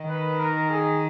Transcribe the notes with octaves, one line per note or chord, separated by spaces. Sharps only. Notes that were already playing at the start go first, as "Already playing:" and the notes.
Already playing: D#3
B4
A#4
G#4